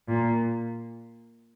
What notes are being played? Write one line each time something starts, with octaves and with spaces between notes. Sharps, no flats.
A#2